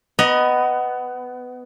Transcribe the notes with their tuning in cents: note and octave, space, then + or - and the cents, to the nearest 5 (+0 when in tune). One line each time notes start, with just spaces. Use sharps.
B3 +15 D#5 -5 A#5 +35